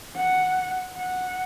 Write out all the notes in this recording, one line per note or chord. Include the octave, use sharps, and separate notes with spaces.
F#5
F#5